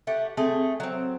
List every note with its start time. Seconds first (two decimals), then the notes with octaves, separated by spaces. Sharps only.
0.07 A3 G4 F#5
0.37 A3 C4 G#4
0.80 F#3 C4